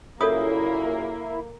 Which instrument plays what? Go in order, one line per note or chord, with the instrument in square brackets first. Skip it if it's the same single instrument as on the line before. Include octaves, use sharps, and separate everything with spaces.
[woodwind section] F#2 A#2 C#3 [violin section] A#3 [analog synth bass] E4 [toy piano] A4 C#5 D#6